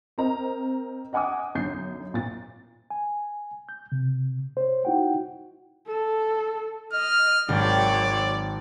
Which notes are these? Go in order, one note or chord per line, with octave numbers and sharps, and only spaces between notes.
C4 A#4 D#5 A#5
D#5 F#5 G#5 D6 D#6
B1 F#2 D3 G6 C7
A#2 A6
G#5
G6
C3
C5 C#5
D#4 E4 F#4 F#5 G5
A4
D#5 F6
G#1 F#3 C#5 D5 G5